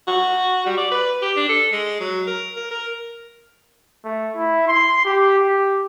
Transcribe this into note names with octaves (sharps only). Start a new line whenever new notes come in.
F#4
G3
D5
B4
G4
D4
A4
G#3
F#3
A#4
A#4
A#4
A3
E4
C6
G4
G4